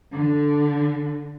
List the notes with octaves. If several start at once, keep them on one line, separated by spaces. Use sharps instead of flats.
D3